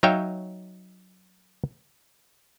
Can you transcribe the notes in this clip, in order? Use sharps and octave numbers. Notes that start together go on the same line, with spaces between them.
F#3 D#4 C#5 E5 F5 G5